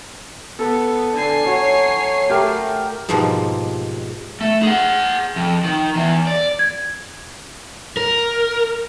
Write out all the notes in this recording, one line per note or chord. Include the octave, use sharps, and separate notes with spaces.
B3 A4
D3 G#5 C7
F#3 C#5
A3 G4 A#4
G#2 B2 F3 G3 A#3
A3
G#4 F#5
F2
D#3
E2 E3
D5
G#6
A#4